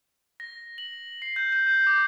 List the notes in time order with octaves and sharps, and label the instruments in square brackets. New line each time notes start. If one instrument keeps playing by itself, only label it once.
[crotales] A#6
F#7
C7
G6
G6
G6
D6